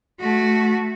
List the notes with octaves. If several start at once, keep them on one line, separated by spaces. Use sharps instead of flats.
A3 F#4